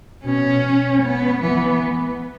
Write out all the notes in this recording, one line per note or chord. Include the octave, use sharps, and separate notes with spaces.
B2 C#4
B3
E3 B3